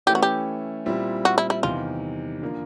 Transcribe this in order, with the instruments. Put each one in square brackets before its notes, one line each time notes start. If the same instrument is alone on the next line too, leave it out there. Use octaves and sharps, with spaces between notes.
[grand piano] E3 A3 C#4 E4 [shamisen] G4
[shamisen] F#4
G4
[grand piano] A#2 G3 C4 E4
[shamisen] F#4
E4
E4
[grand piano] E2 C3 D#3 [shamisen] F4
[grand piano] D3 F3 A#3 D4